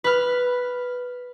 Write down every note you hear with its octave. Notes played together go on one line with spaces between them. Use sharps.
B4 F6